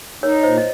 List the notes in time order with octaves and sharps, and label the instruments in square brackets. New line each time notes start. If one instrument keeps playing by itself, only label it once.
[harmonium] D#4 [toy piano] A#4 C#5
[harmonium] A#2 [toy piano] C5 D#5
[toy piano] D#5